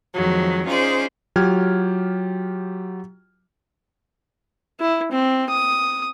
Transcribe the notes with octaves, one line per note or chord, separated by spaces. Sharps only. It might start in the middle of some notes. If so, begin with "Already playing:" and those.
F2 D#3 F3 F#3 G#3
C#4 D#4 F4 G#4 C5 D5
F#3 F4 G4 G5 F6 G#6
E4
C4
D#6